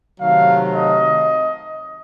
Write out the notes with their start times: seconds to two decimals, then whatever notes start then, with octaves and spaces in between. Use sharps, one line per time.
0.19 C3 D#3 F#3 A3 F5
0.74 D#5